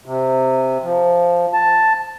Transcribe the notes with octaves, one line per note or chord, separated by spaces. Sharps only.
C3
F3
A5